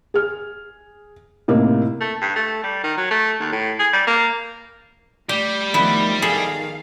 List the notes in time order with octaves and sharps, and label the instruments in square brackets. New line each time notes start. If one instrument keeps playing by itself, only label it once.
[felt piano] G#4 F6
A2 C3 A#3 D#4
[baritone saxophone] A3
G2
A3
G3
D#3
F#3
A3
D#2
A2
G#4
G3
A#3
[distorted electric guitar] G3 [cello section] A3 [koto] G4
[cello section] D#3 F3 A3 [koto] B3 E4
[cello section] D#3 F5 [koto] G#4 A4